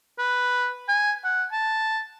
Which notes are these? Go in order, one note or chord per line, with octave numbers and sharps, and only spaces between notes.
B4
G#5
F#5
A5